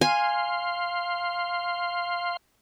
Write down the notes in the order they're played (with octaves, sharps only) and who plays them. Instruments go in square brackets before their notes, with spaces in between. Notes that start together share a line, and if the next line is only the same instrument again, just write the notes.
[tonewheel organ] F5 C6 [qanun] G#5